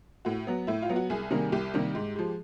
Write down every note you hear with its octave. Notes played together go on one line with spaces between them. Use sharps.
A2 F#4
F#3 B3
A2 E4
F4
F#3 B3
F#4
C2 G#4
C3 D#3 G3 A#3
C2 G4
C3 D#3 G3 A#3
G#2
F3 G#3